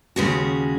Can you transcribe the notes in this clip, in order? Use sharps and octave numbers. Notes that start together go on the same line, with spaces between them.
D#2 C#3 G#3 C#4 F#4